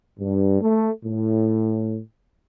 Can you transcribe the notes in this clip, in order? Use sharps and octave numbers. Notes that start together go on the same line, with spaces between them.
G2
A3
A2